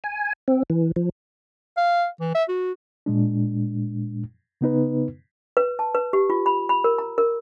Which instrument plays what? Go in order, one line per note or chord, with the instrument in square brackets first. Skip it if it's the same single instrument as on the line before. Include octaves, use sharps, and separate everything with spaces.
[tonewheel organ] G#5
C4
E3
F3
[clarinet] F5
E3
E5
F#4
[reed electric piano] A#2 G#3 D4
C#3 B3 D#4 B4
[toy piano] B4
A5
B4
G4
F4
B5
B5
A#4
A#5
A#4